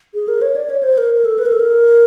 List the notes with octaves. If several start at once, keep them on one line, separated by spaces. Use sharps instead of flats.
G#4
A#4
C#5
D5
C#5
C5
A#4
A#4
A4
B4
A#4
A4
A#4